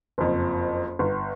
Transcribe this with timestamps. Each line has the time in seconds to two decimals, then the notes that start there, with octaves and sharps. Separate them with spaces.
0.18 F#1 F2
0.99 G1